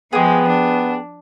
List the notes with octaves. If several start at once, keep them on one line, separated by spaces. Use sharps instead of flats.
F3 G#3 B3 G4 G#4
D4